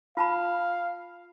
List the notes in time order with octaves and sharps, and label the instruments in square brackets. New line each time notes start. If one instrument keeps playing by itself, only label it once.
[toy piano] F4 A5 B5 [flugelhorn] F5